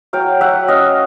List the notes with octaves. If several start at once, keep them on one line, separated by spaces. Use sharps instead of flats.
F#3 F5 G5
F#3 E5 F#5
C#4 D#5 F5